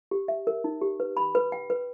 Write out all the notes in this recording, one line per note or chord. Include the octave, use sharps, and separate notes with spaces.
G4
E5
A#4
D#4
G4
B4
B5
B4
G5
B4